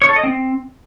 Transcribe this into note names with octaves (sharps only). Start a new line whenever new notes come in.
C#5
A4
D#5
C4